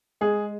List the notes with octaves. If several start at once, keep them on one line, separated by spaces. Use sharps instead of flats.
G#3 G#4